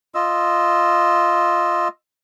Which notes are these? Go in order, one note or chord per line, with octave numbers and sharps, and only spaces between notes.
F4 D#5 E6